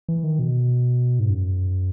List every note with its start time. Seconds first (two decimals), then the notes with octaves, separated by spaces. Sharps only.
0.09 E3
0.24 D#3
0.39 B2
1.19 G#2
1.30 F#2